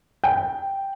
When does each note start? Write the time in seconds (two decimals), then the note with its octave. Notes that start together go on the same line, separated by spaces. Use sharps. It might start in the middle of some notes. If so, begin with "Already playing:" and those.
0.23 G5